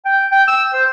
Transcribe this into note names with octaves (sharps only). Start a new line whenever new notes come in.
G5
G5
E6
C5